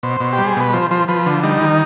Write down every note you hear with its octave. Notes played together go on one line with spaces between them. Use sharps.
B2 C5
B2
G4
G3
G#4
B2 B4
F3 C5
F3 C5
F3 B4
D3
G3 D#4
D#3